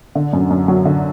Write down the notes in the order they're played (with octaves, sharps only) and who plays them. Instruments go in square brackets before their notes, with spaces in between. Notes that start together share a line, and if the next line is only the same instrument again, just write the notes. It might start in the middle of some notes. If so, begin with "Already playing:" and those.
[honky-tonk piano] D3
F#2
F#2
F#3
D3